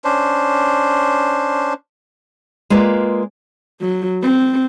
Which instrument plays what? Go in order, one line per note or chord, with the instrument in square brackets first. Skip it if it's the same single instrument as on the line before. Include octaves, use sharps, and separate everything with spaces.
[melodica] C#4 D4 C5
[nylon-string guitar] G#3 A#3 F4 B4 D5
[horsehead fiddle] F#3
C4